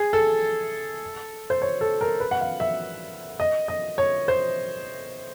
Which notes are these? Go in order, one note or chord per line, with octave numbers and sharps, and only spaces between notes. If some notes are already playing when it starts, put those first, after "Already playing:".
Already playing: G#4
A4
C5
C#5
A4
A#4
B4
F#5
F5
E5
D#5
D#5
C#5
C5